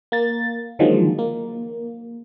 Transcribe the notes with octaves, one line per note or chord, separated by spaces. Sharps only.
A#3 A6
D3 D#3 F3 F#3 G#3 A#3
A#3